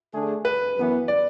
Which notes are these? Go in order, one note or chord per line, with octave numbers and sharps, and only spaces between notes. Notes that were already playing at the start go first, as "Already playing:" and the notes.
D3 A3 D4 G#4
B4
F#2 E3 B3
D5